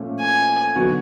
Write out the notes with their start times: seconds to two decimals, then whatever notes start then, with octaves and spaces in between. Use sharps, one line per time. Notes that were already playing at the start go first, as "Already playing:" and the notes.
Already playing: A#2 F3 A3 C#4
0.21 G#5
0.75 D3 F#3 B3 D#4 F#4